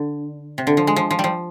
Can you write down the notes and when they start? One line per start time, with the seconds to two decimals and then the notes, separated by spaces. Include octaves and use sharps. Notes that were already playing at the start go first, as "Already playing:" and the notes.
Already playing: D3
0.58 C3
0.67 D3
0.77 F3
0.87 G#3
0.96 F3
1.11 F3
1.19 G3
1.24 F3